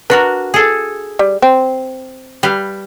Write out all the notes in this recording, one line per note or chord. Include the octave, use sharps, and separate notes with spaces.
D4 F#4 A#4 B4
G#4 A4
G3
C4
G3 B4 F5